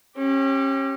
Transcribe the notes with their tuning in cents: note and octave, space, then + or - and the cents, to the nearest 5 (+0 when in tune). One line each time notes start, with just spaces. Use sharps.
C#4 -30 G4 +0